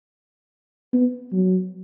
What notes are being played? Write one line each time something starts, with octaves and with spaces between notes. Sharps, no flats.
B3
F#3